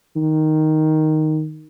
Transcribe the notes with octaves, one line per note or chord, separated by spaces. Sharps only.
D#3